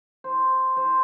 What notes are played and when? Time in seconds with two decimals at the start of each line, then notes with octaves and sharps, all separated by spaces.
0.24 C5
0.77 C5